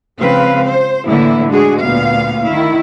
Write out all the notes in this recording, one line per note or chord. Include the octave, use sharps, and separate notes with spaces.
C#3 F3 G#3 C4 B4 F5
C5
A2 D3 E3 A#3 E4
G#3 D4 F#4 G#4
D2 A#2 B3 F5
D#3 E4